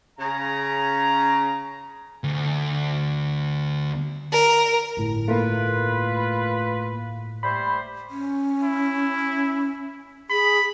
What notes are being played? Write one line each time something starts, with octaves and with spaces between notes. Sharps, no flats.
C#3 A#5
D2
A#4
G1 A2
A3 A#3 F4 B4
G3 A3 C5 B5
C#4
E4
G#4 B5